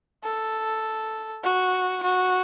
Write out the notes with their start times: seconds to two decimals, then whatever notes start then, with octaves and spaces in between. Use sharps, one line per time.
0.24 A4
1.44 F#4
2.03 F#4